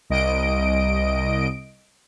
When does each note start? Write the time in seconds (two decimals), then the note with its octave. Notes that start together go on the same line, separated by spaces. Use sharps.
0.10 C2 D#5 D7